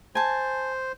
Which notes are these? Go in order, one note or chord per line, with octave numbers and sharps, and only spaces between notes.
C5 G#5 A5